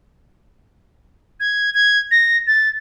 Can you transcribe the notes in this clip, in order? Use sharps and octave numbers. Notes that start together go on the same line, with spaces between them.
G#6
G#6
A#6
A6